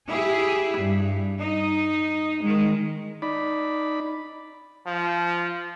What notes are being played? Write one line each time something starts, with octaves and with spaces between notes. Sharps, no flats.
E4 G4 G#4
G2
D#4
D#3 G#3
D#4 D5 B5
F3